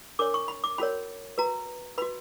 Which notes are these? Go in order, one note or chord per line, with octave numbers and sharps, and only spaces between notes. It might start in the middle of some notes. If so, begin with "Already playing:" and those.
D4 A#4 C#5 D6
C#6
B5
D6
C#4 F#4 A#4 C#5 B5
F#4 B4 A#5
F#4 B4 B5